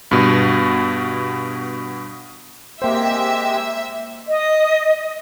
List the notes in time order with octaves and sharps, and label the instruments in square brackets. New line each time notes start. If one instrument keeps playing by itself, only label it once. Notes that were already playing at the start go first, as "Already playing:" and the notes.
[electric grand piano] G2 B2
[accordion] G#3 C4 G4 [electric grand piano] A#3 C5 [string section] E5
[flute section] D#5